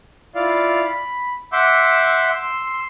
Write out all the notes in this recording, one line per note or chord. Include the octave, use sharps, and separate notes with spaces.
E4 F4 D5 F5
B5
E5 F#5 C6 D6 E6 G6
C6 E6